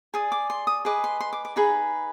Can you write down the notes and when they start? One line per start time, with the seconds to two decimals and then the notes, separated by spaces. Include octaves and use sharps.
0.14 G#4 D5 D#6
0.32 D6
0.50 C6
0.67 D#6
0.85 G#4 B4 D#5 D6
1.04 C6
1.20 C6
1.33 D6
1.45 D6
1.56 D#4 G#4 B4 B5